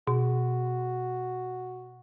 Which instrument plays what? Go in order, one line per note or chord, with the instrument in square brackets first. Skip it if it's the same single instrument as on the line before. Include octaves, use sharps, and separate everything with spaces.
[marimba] B2 [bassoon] F#4